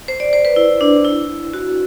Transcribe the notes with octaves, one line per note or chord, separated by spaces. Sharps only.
C5
D5
C5
B4
E4
D4
E4
F#4